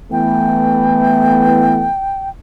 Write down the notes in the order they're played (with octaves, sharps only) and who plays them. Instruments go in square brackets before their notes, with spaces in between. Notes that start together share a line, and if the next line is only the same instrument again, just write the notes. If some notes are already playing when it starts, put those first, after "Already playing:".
[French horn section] E3 A3 B3 [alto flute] G5